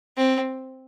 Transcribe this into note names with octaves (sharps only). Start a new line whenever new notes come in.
C4